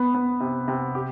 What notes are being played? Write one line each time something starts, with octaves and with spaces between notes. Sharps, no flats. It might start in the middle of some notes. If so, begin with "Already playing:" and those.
Already playing: B3
B3
C3
C3
G4